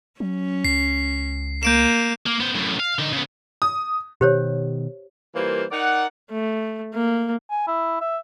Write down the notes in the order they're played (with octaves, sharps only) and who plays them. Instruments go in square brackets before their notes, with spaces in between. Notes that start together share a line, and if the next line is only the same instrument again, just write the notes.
[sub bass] F#3 [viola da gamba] C#4
[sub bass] C#2 [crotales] C7
[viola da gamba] A#3 [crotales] G6 D7 E7
[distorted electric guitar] A#3
B3 C5
F#2 A2
F5
D3 D#4
C#3 B3
[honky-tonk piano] D#6
[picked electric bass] B2 D#3 [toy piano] G4 C5 C#5
[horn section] E3 G3 A#3 F4 A#4 C5
D#4 A#4 D5 F#5
[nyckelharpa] A3
A#3
[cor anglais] G#5
E4
E5